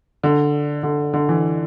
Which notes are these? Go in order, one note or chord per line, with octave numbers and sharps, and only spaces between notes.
D3
D3
D3
E3